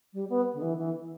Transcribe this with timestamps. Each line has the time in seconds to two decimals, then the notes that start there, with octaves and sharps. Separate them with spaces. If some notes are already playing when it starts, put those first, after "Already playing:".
0.13 G3
0.29 B3
0.54 D3
0.62 E3
0.78 E3